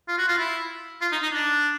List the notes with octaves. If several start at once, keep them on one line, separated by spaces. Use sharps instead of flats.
F4
F#4
F4
E4
F4
D#4
D#4
D4